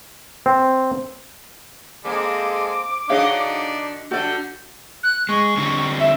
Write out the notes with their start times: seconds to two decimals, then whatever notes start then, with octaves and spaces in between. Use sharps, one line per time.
0.46 C4
2.05 G#3 A#3 C4 A4 D6
3.09 D3 D4 D#4 F#4 G#4 C#5 D#5 F5
4.11 D3 G3 F#4 A4 D5 G6
5.03 F#6
5.29 G#3 C#6
5.57 D3 G3 C4
5.99 E5